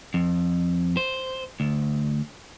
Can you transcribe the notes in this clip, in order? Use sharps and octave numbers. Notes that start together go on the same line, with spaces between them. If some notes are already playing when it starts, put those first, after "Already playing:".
F2
C5
D2